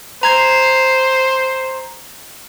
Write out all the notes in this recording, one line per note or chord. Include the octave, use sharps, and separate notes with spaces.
C5 A#5 G#6 C7